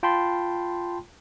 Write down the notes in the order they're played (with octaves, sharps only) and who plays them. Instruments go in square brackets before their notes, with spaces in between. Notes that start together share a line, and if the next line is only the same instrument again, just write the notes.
[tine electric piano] F4 G5 A5 B5 C6